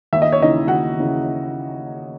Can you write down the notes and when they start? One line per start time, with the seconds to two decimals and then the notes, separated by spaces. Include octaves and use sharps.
0.13 D#2 E5
0.22 D#5
0.32 C#5
0.40 C#3 E3 D#4 D#5
0.68 D#2 F#4 F#5
0.97 C#3 E3